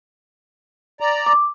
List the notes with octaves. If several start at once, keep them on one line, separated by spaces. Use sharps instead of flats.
D5 A#5
D6